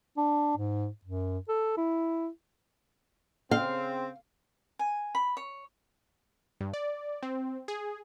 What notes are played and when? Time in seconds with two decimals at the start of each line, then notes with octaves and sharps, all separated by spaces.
0.17 D4
0.57 G#2
1.05 F#2
1.49 A4
1.77 E4
3.51 C#3 C4 F5
4.79 G#5
5.15 B5
5.37 C#5
6.61 G2
6.74 D5
7.23 C4
7.68 G#4